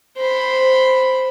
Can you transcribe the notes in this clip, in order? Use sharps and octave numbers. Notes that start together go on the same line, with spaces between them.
C5 B5